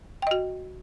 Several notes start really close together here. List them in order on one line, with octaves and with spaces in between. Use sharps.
G5 D#5 F#4